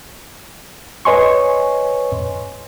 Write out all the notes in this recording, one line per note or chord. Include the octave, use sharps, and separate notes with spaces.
B4 C#5 D#5 G#5 C6 C#6